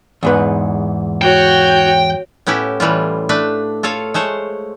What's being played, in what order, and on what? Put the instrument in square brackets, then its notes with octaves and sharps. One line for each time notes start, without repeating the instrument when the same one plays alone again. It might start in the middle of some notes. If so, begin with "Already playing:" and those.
[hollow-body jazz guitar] E2 G#2 B4
[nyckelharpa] F#4 C#5 [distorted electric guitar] G5
[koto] A2 B3 C#4 E4 G4
A2 E3 G3 F4
A3 D4 B4
F4 A4 C#5 F5
G#3 A3 C5 C#5